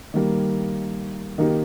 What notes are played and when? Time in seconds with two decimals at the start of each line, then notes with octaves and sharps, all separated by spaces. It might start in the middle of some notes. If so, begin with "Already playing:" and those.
0.14 D#3 G3 A#3
1.38 D#3 A#3 D#4 G4